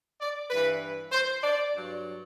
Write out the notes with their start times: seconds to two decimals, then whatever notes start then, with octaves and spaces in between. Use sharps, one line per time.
0.21 D5
0.51 G2 E3 B4
1.12 C5
1.43 D5
1.73 G2 F#3